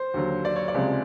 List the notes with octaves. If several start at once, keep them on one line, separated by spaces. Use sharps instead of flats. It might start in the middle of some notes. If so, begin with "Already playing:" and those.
Already playing: C5
D#2 D3 F#3
D5
C#5
D5
C#2 C3 F3 G#3